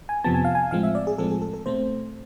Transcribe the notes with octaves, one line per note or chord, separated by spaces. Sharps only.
G#5
F2 C3 F3 B3 A5
G#5
F5
G#5
A2 F3 G#3 C4 F5
E5
D5
G#4
A2 F3 G#3 C4 A4
G#4
A4
A4
B2 A3 C4 C5